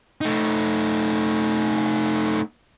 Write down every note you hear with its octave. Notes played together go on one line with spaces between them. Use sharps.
A3 D#4